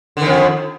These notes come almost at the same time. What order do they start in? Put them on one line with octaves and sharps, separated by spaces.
D3 D#3 F2